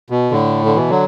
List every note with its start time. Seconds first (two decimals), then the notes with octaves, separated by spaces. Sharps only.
0.10 B2
0.31 A2 D3
0.65 D3
0.75 B2 E3
0.89 D3 F#3